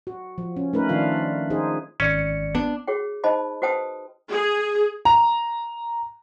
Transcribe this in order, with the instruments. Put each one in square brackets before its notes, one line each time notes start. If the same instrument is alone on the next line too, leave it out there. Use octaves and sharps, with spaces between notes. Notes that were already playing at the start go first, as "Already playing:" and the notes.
[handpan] F#4
F3
C#4
A3 C#4 D#4 A#4 B4
D#3 F3 D4 F4 F5
D#4 F4 G#4 C5
[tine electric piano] G#1 D5 C#7 [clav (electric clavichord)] C#4
[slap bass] B3 [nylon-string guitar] D4
[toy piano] F#4 G#4 C#5 G5
D#4 C5 D#5 A5 B5
F#4 B4 C5 G5 A5 D#6
[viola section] G#4
[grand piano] A#5